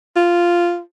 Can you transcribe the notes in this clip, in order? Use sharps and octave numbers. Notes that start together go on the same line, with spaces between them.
F4